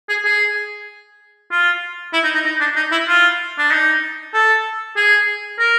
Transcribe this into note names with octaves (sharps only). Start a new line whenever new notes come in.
G#4
G#4
F4
E4
D#4
D#4
D#4
D4
D#4
E4
F4
D4
D#4
A4
G#4
A#4